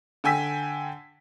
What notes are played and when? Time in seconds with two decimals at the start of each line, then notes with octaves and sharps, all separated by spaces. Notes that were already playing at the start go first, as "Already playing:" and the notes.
0.24 D3 G5 G#5 E6 B6